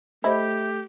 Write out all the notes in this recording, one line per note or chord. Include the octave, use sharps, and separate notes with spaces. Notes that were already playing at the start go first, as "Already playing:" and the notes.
A3 E4 G4 C5 D#5 B5